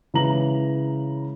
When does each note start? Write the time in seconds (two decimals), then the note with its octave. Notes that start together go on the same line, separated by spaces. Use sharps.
0.14 C#3 E3 G#3 B4 A#5 F#7